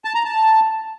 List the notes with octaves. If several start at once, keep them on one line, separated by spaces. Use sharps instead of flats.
A5
A#5
A5